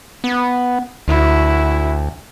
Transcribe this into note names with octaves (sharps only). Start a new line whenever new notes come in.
B3
D2 E4 F#4